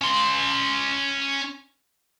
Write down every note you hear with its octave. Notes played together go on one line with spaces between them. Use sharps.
C#4 C6